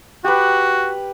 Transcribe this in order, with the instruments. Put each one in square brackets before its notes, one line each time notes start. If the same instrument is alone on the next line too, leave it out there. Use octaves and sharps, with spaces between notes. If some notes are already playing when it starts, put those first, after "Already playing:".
[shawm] F#4 [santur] G4 B4